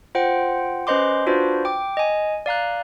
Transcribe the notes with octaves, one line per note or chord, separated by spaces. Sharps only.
F4 C5 F#5 G5
C#4 B4 C5 D#5 C6 D6
D4 F4 F#4 B4 C5 D5
G5 D6
D#5 G#5
D5 F5 A#5 F#6